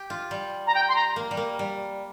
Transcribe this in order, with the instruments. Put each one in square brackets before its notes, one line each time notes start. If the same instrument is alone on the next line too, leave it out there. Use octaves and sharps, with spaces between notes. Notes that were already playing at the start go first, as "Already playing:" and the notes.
Already playing: [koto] G4
F4
G3
[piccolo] A#5
G5
C6
A#5
[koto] A#3
G3
A#3
G3